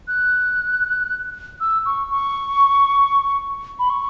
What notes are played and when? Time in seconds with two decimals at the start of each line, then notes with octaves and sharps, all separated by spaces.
0.08 F#6
1.60 E6
1.85 C#6
2.11 C#6
3.79 B5
3.90 C#6